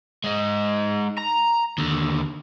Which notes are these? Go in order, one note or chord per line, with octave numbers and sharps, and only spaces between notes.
G#3 D#4
A#5
D#2 D3